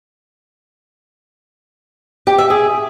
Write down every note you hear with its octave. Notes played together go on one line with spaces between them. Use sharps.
G4
E5
G#4